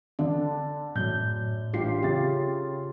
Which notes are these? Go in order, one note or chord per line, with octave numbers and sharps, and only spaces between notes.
D3 D4
F#2 A2 G6
A1 D4 F4 G4 C7
C#3 F4 G4 E5 A6